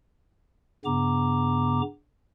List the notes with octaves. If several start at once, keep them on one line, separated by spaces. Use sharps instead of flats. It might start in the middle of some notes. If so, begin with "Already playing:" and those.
G2 C#3 B3 A#5 D6